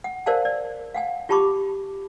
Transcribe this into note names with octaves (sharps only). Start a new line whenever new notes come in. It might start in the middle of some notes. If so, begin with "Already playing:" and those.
F#5
A#4 C5 D5 F5 G#5 A5
D5
F5 F#5 G#5
F4 G4 A5 B5 C#6 D6